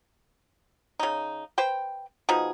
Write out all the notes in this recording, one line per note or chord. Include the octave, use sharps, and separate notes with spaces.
C#3 D#4
B4 C5 G5
B2 F3 D#4 G#4